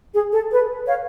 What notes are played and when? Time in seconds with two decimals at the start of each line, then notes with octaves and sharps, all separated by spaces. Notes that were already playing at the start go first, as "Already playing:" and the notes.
0.13 G#4
0.33 A4
0.52 B4
0.87 C#5 F5